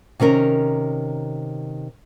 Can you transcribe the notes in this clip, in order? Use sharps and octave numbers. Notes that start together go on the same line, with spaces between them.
C3 D#3 C#4 A#4